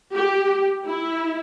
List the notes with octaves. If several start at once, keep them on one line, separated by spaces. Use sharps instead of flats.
G4
E4